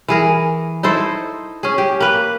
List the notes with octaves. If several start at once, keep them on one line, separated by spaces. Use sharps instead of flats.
E3 G#4 A#4
D#4 E4 A4 C5
C#4 G#4
G4
A#3 B4